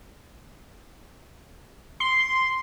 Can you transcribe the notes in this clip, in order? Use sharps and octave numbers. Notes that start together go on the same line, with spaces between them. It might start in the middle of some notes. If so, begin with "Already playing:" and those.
C6